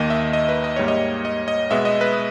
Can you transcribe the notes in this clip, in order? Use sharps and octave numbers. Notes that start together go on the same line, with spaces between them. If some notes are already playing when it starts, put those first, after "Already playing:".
Already playing: D#2 D#3 A#3 D#5
E5
D#5
B4
D#5
G#2 G3 A#3 C#5
D#5
D#5
D#5
B2 G#3 B3 E5
D#5
B4